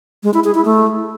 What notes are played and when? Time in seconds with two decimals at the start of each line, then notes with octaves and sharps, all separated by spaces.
0.23 G#3
0.34 E4
0.44 G#4
0.55 E4
0.65 A3